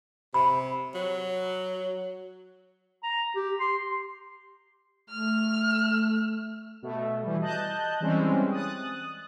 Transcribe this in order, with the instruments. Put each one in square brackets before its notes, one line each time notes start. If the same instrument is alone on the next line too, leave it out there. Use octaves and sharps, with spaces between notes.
[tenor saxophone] C3 [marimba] B5
[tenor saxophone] F#3
[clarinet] A#5
G4
C6
[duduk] A3 [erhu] F6
[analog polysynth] B2 A3
E3 G3
D#5 A5 F#6 G6
E3 G3 G#3 C4 C#4
D#6 F#6 A6